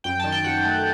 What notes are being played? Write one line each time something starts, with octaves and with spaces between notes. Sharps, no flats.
F#2 G5
D#3 A5
G5
F#2 F#5
A3